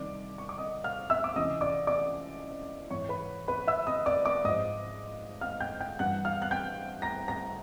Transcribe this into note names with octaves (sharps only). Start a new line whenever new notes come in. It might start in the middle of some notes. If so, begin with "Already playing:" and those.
Already playing: C2 C3 D#3 D5 D6
C#6
D6
D#5 D#6
F5 F6
E5 E6
D6
C#2 C3 E3 D#5 D#6
D5 D6
D5 D6
G#2 E3 C#5 C#6
B4 B5
B4 B5
E5 E6
D#5 D#6
D5 D6
D5 D6
G#2 F3 D#5 D#6
F5 F6
G5 G6
G5 G6
G2 E3 F#5 F#6
F5 F6
F#6
G5 G6
A#5 A#6
A#5 A#6